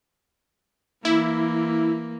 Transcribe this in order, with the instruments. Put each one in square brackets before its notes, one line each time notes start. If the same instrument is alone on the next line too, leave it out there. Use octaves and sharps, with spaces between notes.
[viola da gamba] E3 A#3 [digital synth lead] E4